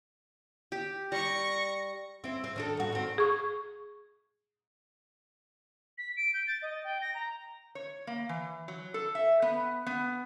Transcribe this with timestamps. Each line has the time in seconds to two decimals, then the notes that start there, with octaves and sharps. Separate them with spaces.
0.72 G4
1.12 G3 C#6 A#6
2.24 C4 E4
2.44 C4
2.56 D#3 D4 A4
2.77 G#2 F#4
2.92 D#3 C4
3.18 G#4 C#6
5.98 B6
6.17 D7
6.34 G6
6.47 A6
6.62 D#5
6.84 G5
7.01 A#6
7.14 A#5
7.75 C#5
8.07 A#3
8.29 E3
8.68 F#3
8.94 A4
9.15 E5
9.42 B3
9.86 B3